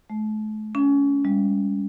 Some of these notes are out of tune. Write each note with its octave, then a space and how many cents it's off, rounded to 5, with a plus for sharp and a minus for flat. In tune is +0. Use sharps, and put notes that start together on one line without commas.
A3 -40
C#4 +25
G3 +35